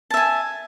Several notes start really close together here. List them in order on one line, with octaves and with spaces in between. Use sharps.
A5 E5 G#5